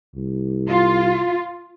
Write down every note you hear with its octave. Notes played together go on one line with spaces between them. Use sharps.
C2
F4